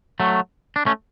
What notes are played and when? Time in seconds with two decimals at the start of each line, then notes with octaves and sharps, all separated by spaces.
0.20 F#3 A3
0.76 D4
0.86 A3 C#4